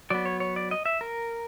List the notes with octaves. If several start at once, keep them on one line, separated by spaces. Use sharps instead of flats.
F#3 B3 D5
C#5
C#5
D5
D#5
E5
A#4